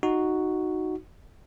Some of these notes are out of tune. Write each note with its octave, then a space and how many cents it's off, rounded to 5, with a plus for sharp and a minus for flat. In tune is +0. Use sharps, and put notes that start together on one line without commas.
D#4 +0 F#4 +0